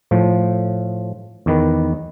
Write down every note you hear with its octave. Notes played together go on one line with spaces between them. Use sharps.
A2 F3
E2 D#3 B4